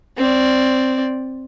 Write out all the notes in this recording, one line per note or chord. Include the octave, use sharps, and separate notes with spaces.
C4 D5